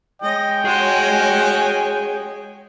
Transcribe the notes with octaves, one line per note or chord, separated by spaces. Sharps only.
G#3 C#5 D#5 G5
C#4 F#4 G#4 C6